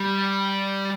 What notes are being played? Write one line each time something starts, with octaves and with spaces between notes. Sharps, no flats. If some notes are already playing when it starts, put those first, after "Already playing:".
Already playing: G3